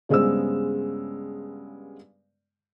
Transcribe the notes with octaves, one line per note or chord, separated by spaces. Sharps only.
G2 C#3 G#3 B3 C5 E6